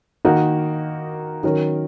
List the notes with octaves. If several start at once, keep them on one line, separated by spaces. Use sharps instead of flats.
D#3 A#3 D#4 F#4 A#4
D#3 F#3 C#4 A#4